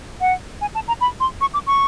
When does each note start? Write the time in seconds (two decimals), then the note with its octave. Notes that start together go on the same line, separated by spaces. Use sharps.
0.21 F#5
0.61 G#5
0.75 A5
0.88 A#5
1.01 B5
1.20 C6
1.41 C#6
1.54 D6
1.67 C#6